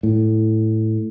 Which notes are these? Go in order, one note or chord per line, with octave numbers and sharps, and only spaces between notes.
A2